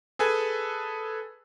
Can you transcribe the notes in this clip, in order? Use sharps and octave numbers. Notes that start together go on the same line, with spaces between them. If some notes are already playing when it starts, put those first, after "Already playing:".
G#4 A4 B4 G#5